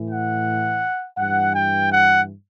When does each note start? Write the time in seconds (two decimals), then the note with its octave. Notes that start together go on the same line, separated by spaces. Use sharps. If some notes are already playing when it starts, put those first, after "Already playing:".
Already playing: A2 E3
0.10 F#5
1.17 G2 E3 F#5
1.53 G5
1.89 F#5